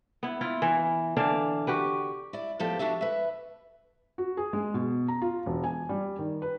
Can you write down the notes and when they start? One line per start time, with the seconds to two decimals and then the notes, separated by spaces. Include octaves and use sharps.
0.23 B3 E4
0.41 E4 F4
0.62 E3
1.17 D3 E3 D4 F5
1.67 F#4 G4 B4
2.33 E4 D5
2.60 A2 F3 B3 G4 A4 G5
2.79 D4 F#4 G4 A4 E5
3.01 B4 E5
4.18 F#4
4.37 G#4
4.53 G#3
4.74 B2
5.08 A#5
5.22 F4
5.46 E1
5.64 G#5
5.89 G3
6.19 D#3
6.42 B4